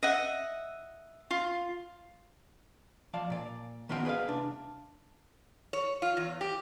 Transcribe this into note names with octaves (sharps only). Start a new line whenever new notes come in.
D#5 E5 F#5
F4
F3 D5 F5 A5
A#2 D5
D#3 B3 F4 F#4 E5 G5
G#4 B4 C5 D#5 F5
C2 D4
C#5
F4
E2
G4